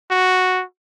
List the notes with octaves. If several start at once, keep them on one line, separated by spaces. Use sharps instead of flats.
F#4